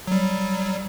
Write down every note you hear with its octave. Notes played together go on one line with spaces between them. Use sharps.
F#3 G3